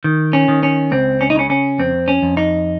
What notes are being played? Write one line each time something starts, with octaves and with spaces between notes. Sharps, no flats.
D#3
C#4
D#3
C#4
C#2 C4
C#4
D#4
C#3 C#4
C#4
F2 C4
C#4
F2
D#4